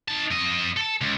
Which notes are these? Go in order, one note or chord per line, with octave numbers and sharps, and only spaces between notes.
D#4 A5
F2 D#5
A4 A5
C#2